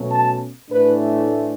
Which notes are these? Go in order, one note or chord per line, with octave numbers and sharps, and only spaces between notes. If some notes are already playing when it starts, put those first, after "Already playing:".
Already playing: B2 F#3 A3 C#4
A5
A2 E3 A3 D4 B4